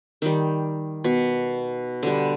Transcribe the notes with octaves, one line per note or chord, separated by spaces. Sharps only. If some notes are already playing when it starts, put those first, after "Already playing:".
D#3 G3
B2
D3 G3